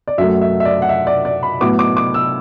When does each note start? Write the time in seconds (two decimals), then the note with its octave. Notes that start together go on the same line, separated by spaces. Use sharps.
0.08 D5
0.18 F#2 F#3 A3 E5
0.41 E5
0.60 E5
0.65 D5
0.82 F#5
0.89 E5
1.07 D5
1.25 D5
1.43 B5
1.61 A2 F#3 B3 D6
1.79 D6
1.97 D6
2.14 E6